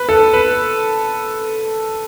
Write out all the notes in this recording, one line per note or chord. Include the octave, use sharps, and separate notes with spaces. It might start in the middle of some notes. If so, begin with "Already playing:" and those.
Already playing: B4
A4
B4